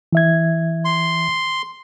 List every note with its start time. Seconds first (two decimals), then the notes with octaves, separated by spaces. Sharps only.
0.13 E3 E5 G#6
0.85 C6